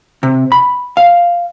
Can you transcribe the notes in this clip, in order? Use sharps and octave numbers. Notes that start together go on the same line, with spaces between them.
C3
B5
F5